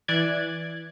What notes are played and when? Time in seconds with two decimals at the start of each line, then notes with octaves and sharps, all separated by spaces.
0.08 E3 D5 F#6 G#6